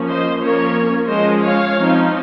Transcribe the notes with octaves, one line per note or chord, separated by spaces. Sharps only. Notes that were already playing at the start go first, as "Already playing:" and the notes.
Already playing: F3 A#3 C#4
C5 D#5
F3 A#3 C#4 A#4 C#5
F3 G#3 C#4 C5 D#5
C#5 F5
F3 C4 D#4